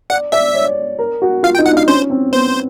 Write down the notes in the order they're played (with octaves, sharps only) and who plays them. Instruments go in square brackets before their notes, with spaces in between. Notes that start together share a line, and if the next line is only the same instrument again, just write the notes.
[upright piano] D5 [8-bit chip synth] F#5
[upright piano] D5 [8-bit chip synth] E5
[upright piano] C#5
A#4
F#4
[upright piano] F4 [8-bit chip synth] F5
[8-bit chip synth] G5
[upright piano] D#4
[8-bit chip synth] F#5
[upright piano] D4
[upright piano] D#4 [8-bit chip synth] F5
[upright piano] C#4 [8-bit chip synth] C5
[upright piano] C4
[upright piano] B3 [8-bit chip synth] C5